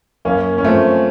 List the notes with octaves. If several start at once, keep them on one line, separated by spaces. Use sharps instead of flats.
F#2 A#3 C#4
C#4
F3 A3 C4